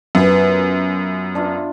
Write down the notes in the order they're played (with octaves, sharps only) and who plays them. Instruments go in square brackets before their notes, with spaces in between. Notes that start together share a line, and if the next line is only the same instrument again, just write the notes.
[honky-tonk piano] F#2 [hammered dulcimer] B3 F4
[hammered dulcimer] D4 F4 E5